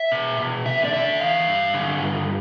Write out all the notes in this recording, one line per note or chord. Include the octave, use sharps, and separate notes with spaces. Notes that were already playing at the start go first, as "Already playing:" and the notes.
Already playing: E5
B2
B2
D3 E5
D5
D3 E5
E2 F5
G2
D3
G2